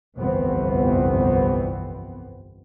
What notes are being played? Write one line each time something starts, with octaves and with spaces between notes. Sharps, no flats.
G1 C2 F2 E3 B3 C4